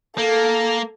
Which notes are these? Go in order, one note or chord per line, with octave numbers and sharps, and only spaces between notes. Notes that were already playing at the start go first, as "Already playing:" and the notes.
A#3 A4